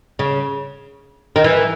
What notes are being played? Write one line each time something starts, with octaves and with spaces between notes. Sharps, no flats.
C#3
D#3
E3